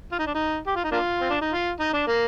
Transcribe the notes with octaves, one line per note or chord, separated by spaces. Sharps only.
F4
D#4
D4
D#4
G4
F4
D#4
A#3 D4 F4
C4
D4
D#4
F4
D#4
D4
A#3